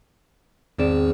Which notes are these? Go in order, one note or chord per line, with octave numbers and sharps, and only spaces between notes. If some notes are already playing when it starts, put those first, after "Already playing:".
G#1 E2 C4 D5 E7